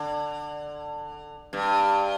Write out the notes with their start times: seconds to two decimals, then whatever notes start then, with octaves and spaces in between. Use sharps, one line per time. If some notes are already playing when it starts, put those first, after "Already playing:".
Already playing: D3
1.53 G2